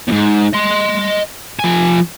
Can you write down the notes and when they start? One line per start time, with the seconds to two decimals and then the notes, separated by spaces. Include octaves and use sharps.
0.08 E2 G#2
0.53 D#5 C6
1.59 F3 G#5